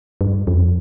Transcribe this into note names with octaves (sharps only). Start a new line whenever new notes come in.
G2
F2